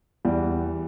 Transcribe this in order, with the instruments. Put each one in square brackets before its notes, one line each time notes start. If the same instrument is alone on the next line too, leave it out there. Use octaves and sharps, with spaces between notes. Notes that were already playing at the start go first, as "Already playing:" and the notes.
[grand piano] E2 [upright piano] E3 G3